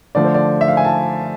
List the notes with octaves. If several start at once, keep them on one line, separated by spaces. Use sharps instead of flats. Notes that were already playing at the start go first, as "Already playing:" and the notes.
D3 F3 A3 D5
C5
D5
E5
F5
G#5
A5